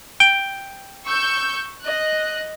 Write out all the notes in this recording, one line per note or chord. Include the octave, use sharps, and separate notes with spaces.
G5
C#6 E6 G6
D#5 F#6